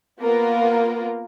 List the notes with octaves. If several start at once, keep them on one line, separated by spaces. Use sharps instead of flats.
A#3 B3 F4 A#4